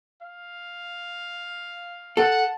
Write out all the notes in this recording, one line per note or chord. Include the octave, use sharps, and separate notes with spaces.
F5
A4 F#5 A5